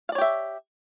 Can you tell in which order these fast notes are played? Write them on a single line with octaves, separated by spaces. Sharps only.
F5 D5 C#5 G4 E5